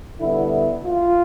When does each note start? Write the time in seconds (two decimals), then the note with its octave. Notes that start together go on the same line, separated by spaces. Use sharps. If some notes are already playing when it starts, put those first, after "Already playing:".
0.20 D3 G3 B3 E4
0.85 F4